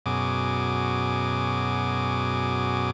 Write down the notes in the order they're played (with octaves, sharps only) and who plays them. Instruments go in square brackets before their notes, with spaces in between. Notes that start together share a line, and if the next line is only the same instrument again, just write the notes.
[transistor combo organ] F#2 B2 G#4 D6